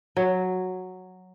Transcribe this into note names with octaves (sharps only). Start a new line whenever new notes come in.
F#3